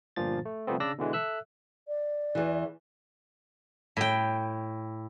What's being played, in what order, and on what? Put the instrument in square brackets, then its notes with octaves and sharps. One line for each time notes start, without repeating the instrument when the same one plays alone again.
[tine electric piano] G1 G2 A#2 F3 A6
A3
C3 F3 G3 A3 B3 C4
C#3 D4 D5 E6 A#6
B2 D3 E3 G#3
A4 E5 E6 F#6
[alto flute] D5
[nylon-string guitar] E2 E3
[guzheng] A2 G5